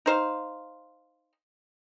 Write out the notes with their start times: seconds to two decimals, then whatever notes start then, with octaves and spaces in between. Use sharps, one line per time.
0.06 D#4 C5 F5